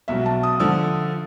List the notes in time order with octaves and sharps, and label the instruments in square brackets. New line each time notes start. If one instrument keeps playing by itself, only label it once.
[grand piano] B1 B2 F#3 [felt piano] E5
[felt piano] A5
D#6
[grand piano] D3 F3 [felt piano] E6